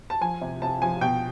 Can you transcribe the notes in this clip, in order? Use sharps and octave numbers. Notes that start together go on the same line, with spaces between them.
A5
F3 G#5
C3
C3 A5
F3 G#5
B2 G5